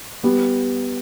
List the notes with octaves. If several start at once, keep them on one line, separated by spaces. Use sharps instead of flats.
G3 B3